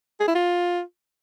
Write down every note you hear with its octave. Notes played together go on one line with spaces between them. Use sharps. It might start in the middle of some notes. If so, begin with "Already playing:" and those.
G#4
E4
F4